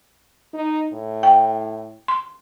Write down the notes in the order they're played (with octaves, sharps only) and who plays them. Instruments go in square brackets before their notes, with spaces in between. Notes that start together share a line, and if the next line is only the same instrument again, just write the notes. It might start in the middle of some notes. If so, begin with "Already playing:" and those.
[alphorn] D#4
A2
[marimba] G5
C6